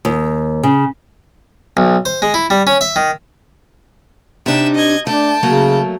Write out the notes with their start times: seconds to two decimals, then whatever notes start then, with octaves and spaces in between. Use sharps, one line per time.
0.05 D#2
0.63 C#3
1.77 B1
2.05 C5
2.22 G#3
2.34 E4
2.50 G3
2.67 C#4
2.81 E5
2.96 D#3
4.46 C3 D4 D#4 E5 E7
4.75 D#5 G#6
5.07 A3 D4 G5 A5
5.43 C#3 F#3 A3 A#3